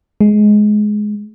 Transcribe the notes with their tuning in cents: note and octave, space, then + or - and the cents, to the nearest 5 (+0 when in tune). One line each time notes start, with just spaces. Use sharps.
G#3 +15